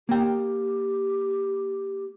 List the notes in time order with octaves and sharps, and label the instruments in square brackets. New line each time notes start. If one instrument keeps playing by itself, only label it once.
[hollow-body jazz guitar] A#3 G5 [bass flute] G4